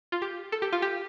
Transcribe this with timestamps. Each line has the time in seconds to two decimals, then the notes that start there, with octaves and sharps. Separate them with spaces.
0.12 F4
0.22 G4
0.52 A4
0.62 G4
0.73 F4
0.82 G4